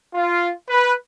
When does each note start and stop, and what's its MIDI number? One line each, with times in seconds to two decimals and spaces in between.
0.14 0.51 65
0.69 0.93 71